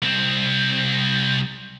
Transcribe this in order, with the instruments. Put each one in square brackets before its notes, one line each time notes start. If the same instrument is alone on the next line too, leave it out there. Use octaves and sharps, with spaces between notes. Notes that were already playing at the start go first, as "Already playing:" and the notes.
[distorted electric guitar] C2 C4